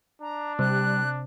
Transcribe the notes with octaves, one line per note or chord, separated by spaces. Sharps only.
D4 A#5
C3 G3 F#6